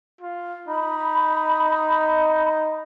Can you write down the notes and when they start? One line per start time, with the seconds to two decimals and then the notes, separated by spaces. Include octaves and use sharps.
0.21 F4
0.68 D#4 B5